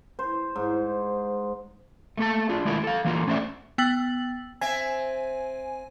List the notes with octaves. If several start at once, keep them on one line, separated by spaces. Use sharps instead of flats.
C5
G#2
A3 A#3 A4 A5
D4 F4 G#4
D#3 G#3 A3 E4 F4 A#4
A4 F5
E3 F#3 A#3 F4 A4 A#4
A3 C#4 A4 C5 D5 E5
B3 G5 E6 A6 F#7
C4 E5 G#5